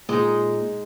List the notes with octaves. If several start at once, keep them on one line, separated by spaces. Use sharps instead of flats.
A#2 G#3 D#4